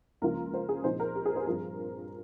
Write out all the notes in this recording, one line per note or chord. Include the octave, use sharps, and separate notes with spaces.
C#2 C#3 F3 A#3 F4 A#4
C5
G#4
A#2 F3 C4 D#4 C5
A#4
G4
G#4
C5
G2 F3 C4 F4 A#4